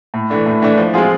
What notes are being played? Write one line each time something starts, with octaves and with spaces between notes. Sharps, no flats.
A2
E3 A3 D4
A2
E3 A3 D4
F3
G#3 C4 F4 G#4